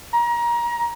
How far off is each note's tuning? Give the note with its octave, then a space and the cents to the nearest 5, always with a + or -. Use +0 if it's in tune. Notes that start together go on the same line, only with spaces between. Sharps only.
A#5 +30